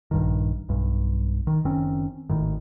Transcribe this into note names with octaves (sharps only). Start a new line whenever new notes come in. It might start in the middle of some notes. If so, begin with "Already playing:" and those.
A#1 G2 D#3
B1 G2
D#3
F#1 D#3 C4 C#4
G#1 A2 D#3